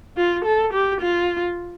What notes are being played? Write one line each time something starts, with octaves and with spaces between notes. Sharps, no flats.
F4
A4
G4
F4